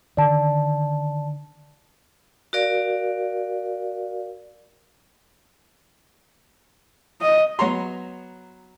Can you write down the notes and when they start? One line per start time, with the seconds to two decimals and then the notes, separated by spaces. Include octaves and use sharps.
0.17 D3 D#3 D5 A5
2.53 F#4 A#4 D5 F5
7.22 D#5
7.59 F#3 B3 F#4 C#5 A#5 C6